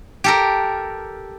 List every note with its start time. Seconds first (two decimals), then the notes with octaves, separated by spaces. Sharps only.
0.24 G4 A4 A#4